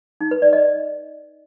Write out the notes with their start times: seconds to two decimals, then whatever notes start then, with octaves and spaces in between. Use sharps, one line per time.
0.21 D#4
0.31 B4
0.42 D5
0.53 D#5